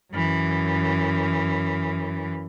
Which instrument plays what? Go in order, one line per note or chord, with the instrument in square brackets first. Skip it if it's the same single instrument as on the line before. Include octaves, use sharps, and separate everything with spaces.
[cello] F#2 E3